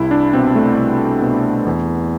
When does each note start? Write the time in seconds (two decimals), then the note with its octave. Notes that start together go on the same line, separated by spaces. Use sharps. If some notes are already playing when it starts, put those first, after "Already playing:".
Already playing: C2 E4
0.11 D4
0.33 B2 C4
0.55 A3
0.77 C2
1.22 B2
1.67 E2